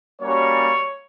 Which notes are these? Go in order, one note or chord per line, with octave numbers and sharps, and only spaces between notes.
G3 A#3 C#4 F#4 C#5